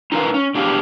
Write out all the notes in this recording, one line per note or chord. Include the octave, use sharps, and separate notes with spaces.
D#4 F4 A#4 B4 F5
C#4
B2 D4 G4 G#4 F5